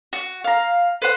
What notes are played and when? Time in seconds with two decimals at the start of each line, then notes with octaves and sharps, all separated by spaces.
0.13 F#4
0.44 F5 A#5
1.02 B4 C5 F#5